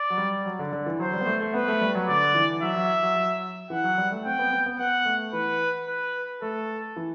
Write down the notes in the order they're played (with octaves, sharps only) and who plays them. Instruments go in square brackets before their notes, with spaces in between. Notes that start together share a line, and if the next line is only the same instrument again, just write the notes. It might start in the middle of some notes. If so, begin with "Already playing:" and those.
Already playing: [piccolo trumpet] D5
[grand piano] F#3
G3
F#3
D3
D3
E3
[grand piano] F#3 [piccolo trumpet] C5
[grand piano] G3
B3
A3
A3
[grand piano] B3 [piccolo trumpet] B4
[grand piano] A3
G3
F#3
[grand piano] D3 [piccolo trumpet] D5
[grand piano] E3
[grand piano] F#3 [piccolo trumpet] E5
[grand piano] F#3
F#3
F#3
[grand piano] E3 [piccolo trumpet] F#5
[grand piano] F#3
G3
A3
[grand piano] C4 [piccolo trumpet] G5
[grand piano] B3
B3
B3
[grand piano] B3 [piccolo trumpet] F#5
[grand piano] A3
[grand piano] E3 [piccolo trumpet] B4
[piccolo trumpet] B4
[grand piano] A3 [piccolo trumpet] A4
[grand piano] E3